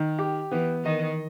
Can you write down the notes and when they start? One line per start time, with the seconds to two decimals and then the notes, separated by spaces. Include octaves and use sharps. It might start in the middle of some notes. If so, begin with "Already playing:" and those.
Already playing: D#3
0.19 G4
0.51 E3 B3
0.84 D#3 D#5